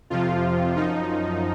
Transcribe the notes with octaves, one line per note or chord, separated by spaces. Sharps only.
F2 C3 F3 F4
F#2 F3 D#4